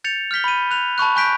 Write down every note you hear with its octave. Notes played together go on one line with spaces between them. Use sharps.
G6 A6 C#7 F7
F6 G6 B6 G7
B5 D#7
F#6 F7
A5 B5 C#6 F#6
G#5 C#6 F#6 G6 B6 D7